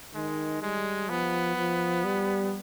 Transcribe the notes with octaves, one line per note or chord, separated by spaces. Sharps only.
D#3 G#3
G3 G#3
F3 B3
F3
G3